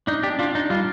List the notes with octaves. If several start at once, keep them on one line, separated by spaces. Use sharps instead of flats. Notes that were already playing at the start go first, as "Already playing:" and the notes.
D4 D#4
D4 G4
D4 F4
D4 D#4
G3 F4